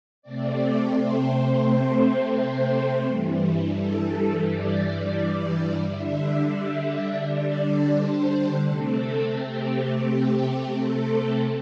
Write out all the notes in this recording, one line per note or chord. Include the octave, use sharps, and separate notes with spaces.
C3 A3 C4 D5
C5
C5
G2 E3 G3
A4
A4
D5
D3 G3 D4 E5
E5
D5
C5
C3 A3 C4 A4
G4
G4
A4